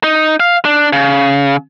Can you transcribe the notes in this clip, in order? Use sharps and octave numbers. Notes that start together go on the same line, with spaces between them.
D#4
F5
D4
C#3